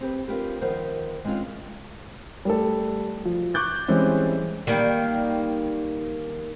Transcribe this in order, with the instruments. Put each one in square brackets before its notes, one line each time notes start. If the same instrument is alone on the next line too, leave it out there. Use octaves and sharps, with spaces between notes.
[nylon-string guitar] C4 G4 B4
C4 D4 F4 G4 A#4 B4
D#3 F3 B3 A#4 C5
G#3 C4 C#4 D#4 F4
[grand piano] G3 A3 A4
F3
C#6 D6 F#6 G6 A6
E3 G3 G#3 C4 C#4
[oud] D#3 G3 A#3